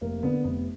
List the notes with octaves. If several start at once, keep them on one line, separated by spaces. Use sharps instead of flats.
F1 A#3
D3 B3
F1 B3